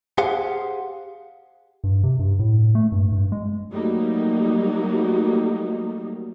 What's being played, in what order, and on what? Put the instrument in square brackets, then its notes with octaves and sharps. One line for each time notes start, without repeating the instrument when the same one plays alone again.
[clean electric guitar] G4 G#4 C5 F5 F#5
[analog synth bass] G2
C3
G2
A2
A3
G2
G2
G#3
[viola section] F#3 G3 A3 A#3 D#4